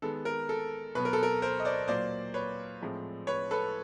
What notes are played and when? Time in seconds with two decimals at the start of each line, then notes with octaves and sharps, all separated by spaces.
0.02 D#3 G#3 B3 A4
0.25 A#4
0.49 A4
0.95 B2 F#3 B3 B4
1.05 A#4
1.13 A4
1.23 A#4
1.42 A#4 C5
1.60 D#5
1.65 C5 D5
1.88 A#2 F#3 A#3 C5 D5
2.34 B4 C#5
2.81 A2 F3 G#3 C4
3.27 B4 C#5
3.51 A4 B4